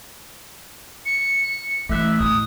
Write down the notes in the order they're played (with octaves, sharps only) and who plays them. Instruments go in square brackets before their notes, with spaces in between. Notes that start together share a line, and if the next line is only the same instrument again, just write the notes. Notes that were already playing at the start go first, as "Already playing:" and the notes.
[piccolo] C#7
[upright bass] E3 [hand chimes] A3 F#6 [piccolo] E5
[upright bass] E2 A2 [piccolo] D#6